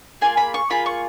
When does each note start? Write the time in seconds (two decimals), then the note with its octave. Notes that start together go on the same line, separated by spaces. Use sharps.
0.21 A#3 F4 G#4 G#5
0.37 B5
0.54 C#6
0.70 A#3 F4 G#4 B5
0.86 C#6